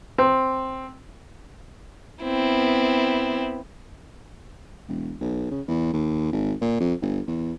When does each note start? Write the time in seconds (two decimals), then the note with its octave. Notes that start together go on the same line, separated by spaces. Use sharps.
0.18 C4
2.23 B3 C4 E4
4.88 E1
5.21 B1
5.51 C#3
5.68 E2
5.93 D#2
6.33 G#1
6.61 A#2
6.80 F2
7.02 G1
7.27 E2